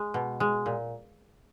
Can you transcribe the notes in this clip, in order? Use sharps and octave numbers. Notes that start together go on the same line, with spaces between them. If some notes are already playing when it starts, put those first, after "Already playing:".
Already playing: G#3
B2
G#3
A#2